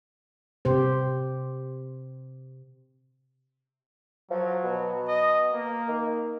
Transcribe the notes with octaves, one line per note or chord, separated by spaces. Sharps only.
C3 G4 C5
F3 F#3
B2
D#5
A#3
D#3